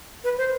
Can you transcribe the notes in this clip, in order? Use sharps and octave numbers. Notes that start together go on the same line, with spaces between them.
B4
C5